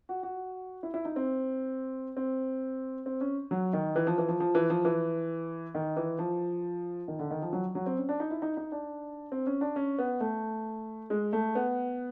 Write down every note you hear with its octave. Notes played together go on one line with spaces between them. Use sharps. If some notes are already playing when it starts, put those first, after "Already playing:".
F#4
F#4
E4
E4
D#4
C4
C4
C4
C#4
F#3
D#3
E3
F3
E3
F3
F3
E3
F3
E3
D#3
E3
F3
D#3
D3
D#3
F3
F#3
F#3
C4
C#4
D4
D#4
E4
D#4
D#4
D4
C4
C#4
D4
C#4
B3
A3
G#3
A3
B3